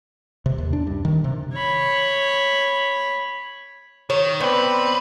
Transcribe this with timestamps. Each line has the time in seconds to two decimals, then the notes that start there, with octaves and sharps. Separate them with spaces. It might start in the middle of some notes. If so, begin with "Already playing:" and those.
0.46 C3
0.58 D#2
0.73 D4
0.87 G2
1.05 D#3
1.24 C3
1.53 C#5 B5
4.10 D#3 C#5
4.40 B1 B3 C4 B4 C5 D5